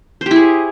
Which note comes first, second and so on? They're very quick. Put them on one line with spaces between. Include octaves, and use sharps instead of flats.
C5 G4 E4 G#4